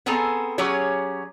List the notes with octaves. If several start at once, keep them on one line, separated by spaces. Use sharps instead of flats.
B3 C4 G#4 A4 G#5 A#5
F#3 C#4 G4 G#4 C#5